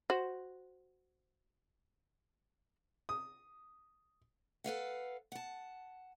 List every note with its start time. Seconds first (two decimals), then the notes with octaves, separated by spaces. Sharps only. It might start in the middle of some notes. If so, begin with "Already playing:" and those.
0.10 F#4 C5
3.09 D#6
4.64 A4 B4 F5 F#5
5.32 F#5 A5